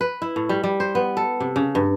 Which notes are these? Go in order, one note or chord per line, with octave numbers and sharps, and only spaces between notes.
B4
E4
A2
G3
G3
C5
B3
A4
C3
C#3
G2